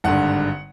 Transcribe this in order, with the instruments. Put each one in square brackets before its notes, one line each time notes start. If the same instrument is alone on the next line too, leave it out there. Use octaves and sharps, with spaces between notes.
[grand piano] G#1 G2 D3 F#5